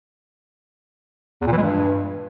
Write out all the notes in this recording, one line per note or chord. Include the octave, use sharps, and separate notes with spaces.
E2
A#2
E3
G#3
G2